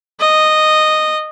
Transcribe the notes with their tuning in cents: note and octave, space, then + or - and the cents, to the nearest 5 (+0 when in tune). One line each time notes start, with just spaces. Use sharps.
D#5 -10